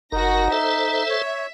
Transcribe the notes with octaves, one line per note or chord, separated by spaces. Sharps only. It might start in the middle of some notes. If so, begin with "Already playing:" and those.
F#1 D#4 F#4 A#4 A#6
A4 C5 E5
C#5